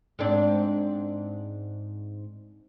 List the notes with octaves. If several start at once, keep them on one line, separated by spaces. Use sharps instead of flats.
G#2 C4 D4